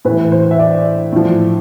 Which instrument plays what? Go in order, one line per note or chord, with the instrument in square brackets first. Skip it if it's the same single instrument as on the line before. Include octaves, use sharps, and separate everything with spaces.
[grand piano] A2 E3 B4
C5
E5
D5
A2 F3